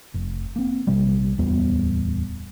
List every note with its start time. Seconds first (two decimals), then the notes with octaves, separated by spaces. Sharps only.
0.14 F1
0.56 A#3 C4
0.87 A#1 C3 G3
1.38 D1 E2 G3 B3